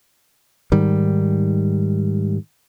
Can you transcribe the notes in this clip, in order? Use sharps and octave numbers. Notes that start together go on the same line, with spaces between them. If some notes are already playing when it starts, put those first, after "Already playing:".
G#2 D#3 G3